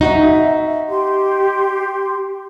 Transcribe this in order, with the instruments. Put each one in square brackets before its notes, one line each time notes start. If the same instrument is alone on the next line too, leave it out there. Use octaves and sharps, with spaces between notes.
[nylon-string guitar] D#4 F#4 [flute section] E5
[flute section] G4 C6